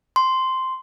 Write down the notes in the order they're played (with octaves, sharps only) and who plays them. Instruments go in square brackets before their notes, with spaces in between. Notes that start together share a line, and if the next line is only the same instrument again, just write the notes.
[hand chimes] C6